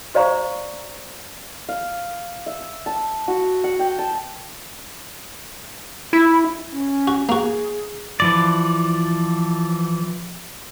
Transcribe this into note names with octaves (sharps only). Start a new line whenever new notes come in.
F#4 C5 D5 F5 A#5 C#6
F5
E5
A5
F#4
F#5
G5
A5
E4
C#4
F#4
A#3 F#4 G#4
E3 F3 D5